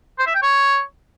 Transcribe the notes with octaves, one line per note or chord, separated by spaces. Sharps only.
C5
E5
G5
C#5